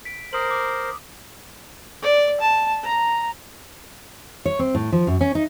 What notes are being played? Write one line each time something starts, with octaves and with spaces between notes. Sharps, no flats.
B6 D7
A#4 C5 D#6 F#7
D6
D5
A5
A#5
C#5
C4
A2
F3
F#2
C#4
D#4